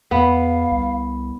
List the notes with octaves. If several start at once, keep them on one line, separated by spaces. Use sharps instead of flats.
E2 B3 F5
C2